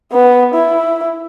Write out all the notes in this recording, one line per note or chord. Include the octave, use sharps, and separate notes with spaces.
B3
E4